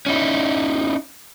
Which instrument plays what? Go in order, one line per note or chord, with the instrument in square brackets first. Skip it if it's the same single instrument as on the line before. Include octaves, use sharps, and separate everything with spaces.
[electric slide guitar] C#4 D#4 E4